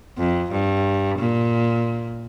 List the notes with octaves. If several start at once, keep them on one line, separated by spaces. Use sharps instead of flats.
F2
G2
A#2